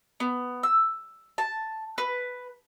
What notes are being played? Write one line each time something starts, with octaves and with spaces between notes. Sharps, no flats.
B3
E6
A5
B4